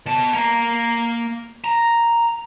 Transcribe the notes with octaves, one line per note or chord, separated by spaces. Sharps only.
B2 A5
A#3 A#5
A#5